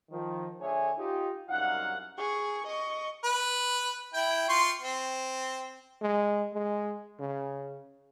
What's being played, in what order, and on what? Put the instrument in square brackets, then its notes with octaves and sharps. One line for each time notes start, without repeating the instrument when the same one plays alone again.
[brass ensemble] D#3 F3
D3 A3 G#4 C#5 E5 G#5
D#4 F4 G4
C2 F#2 D#4 F5 F#5
[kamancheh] G#4 C#6
D#5 C#6
[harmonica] B4
E4 G5
F4 C6 C#6
C4
[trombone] G#3
G#3
C#3